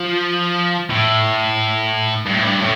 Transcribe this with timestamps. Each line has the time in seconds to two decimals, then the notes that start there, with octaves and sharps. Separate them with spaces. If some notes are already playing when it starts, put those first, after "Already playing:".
Already playing: F3
0.90 A2
2.26 G2
2.34 A2
2.43 G2
2.60 A2